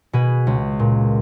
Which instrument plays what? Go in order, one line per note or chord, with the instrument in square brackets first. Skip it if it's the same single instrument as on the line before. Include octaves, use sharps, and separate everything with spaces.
[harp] B2 G#4 B4
C#2
A#2